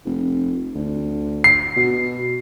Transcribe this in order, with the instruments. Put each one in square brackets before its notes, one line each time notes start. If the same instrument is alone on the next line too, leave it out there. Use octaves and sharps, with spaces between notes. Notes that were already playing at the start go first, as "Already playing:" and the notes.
[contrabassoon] F1
D2
[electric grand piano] C7
[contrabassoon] B2